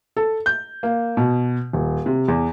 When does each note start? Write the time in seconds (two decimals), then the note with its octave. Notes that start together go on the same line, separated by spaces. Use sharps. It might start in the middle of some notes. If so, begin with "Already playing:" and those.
0.17 A4
0.46 G6
0.83 A#3
1.17 B2
1.73 D#1
2.06 C3
2.28 E2